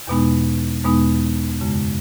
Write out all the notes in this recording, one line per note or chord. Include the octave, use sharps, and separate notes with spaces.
E2 B2 G#3 B3 D#4
E2 B2 G#3 B3 D#4
F#2 C#3 G#3